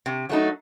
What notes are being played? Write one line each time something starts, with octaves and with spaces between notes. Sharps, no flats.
C3
F#3 A3 D#4